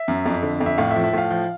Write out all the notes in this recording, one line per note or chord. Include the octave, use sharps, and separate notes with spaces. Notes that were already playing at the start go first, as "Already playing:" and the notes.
Already playing: E5
F#2
F2
D3
F2
E5
A2 F5
E5
F3
E5
A2 F5
F3